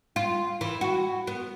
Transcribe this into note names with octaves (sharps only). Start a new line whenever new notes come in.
F4
E3
F#4
B3